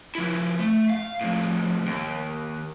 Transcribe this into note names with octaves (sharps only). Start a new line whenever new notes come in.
F3 E4
A3
F5
A2 F3
D#2